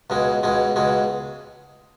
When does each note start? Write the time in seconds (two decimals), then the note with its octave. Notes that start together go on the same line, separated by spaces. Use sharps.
0.10 C#2 B2 G#3
0.43 C#2 B2 G#3
0.76 C#2 B2 G#3